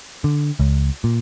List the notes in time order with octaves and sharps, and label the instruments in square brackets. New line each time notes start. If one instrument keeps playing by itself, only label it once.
[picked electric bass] D3
C#2
A#2